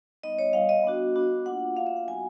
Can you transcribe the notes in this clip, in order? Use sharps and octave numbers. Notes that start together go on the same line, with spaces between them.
G3 B3 D#4 D#5
C#5
G3 B3 D#4 F5
D#5
B3 D4 F#4
B3 D4 F#4
A#3 D4 F4 F#5
A#3 D4 F4 F5
E5
F#5
F#3 B3 D#4 F#4 G#5